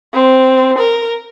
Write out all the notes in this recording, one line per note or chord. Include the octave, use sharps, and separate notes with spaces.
C4
A#4